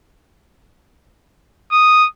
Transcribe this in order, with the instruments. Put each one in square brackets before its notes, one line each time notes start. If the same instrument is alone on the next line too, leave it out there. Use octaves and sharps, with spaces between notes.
[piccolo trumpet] D#6